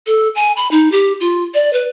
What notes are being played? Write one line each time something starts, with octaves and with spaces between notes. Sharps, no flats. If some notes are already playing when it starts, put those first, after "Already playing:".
A4
G#5
B5
D#4
G4
F4
D5
B4